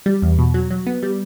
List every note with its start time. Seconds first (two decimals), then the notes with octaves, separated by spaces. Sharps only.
0.06 G3
0.22 E2
0.38 B2
0.54 F#3
0.71 F#3
0.87 B3
1.03 G3